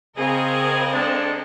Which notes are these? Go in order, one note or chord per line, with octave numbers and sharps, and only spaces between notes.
C#3 C4 G#4 A#4 D#5
G#3 D4 A4